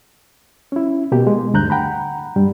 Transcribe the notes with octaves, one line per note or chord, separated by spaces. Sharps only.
C#4 E4
B2 A#3 G4
G#3
D2 G2 A#5 F#6 G6
F#5 G5 A#5 B5
G2 G3